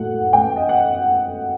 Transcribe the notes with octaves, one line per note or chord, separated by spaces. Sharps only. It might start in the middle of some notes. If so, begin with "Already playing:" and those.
Already playing: A2 F#3 A3 F#5
A1 G5
D#5
F#5